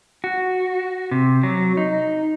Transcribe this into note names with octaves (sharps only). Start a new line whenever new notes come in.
F#4
C3
F#3
D#4